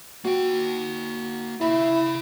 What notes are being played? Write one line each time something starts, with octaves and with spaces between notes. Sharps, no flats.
A#3 F#4 G5
E4 G#4 F5 B5